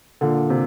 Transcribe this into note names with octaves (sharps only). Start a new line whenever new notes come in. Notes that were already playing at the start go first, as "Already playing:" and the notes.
A#2 D3
C3